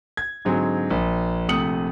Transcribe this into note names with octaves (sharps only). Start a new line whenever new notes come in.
G#6
G#2 D3 F#3 C4 G#4
A#1
A#1 C3 A3 D#6 C#7 F#7